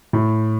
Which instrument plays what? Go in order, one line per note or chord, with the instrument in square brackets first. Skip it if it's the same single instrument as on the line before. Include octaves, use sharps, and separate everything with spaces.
[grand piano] A2